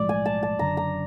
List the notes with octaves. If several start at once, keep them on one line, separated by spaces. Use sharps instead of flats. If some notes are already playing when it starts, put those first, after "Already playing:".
Already playing: B1 A2 F3 G#3 D5
G#5
A5
A5
F#1 F#2 D3 A#5
A#5